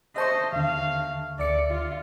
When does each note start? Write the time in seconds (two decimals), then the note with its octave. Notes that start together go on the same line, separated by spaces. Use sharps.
0.16 C5 D#5 E5 A5 C#6
0.52 D#2 D3 F5
1.39 D2 D5 E5 C#7
1.70 F4